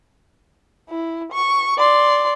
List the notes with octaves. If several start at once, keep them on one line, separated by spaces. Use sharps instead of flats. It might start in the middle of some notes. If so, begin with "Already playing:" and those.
E4
C#6
D5 C6